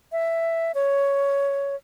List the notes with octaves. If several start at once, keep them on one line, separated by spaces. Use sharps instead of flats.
E5
C#5